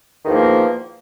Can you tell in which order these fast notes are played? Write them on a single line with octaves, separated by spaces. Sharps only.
D#3 E2 F3 A#3